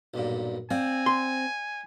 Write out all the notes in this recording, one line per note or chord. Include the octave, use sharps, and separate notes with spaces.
B1 G2 A#2
C4 D5 F5 G#5
C6